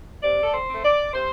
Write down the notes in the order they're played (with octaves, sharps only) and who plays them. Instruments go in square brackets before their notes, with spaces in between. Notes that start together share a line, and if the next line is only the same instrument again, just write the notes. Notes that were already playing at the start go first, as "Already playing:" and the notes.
[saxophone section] C3 D5
A4
C5
A3 C4
D5
C3 C5